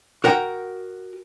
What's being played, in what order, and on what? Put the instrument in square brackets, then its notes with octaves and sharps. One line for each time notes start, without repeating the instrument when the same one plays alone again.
[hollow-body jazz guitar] F#4 A#4 F#5 G5